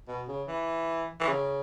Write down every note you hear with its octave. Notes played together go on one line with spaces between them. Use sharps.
B2
C#3
E3
E3
C#3